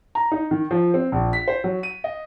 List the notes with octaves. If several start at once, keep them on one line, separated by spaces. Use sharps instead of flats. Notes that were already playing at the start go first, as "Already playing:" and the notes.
A#5
D#4
D#3
F3
C4
A#1
B6
C5
F#3
D#7
D#5